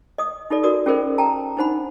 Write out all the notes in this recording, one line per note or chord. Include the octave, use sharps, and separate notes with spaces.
D#5 D#6
D#4 F4 A4 D5
F#4 A#4 D5 D#6
C#4 F4 G#4 A#4 C5 D#5
G5 A5 A#5
D4 D#4 C5 F#5 B5